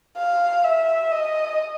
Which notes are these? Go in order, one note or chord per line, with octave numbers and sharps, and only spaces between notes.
F5
E5
D#5